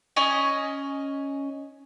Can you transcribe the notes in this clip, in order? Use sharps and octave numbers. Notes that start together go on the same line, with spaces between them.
C#4 D#5 G#5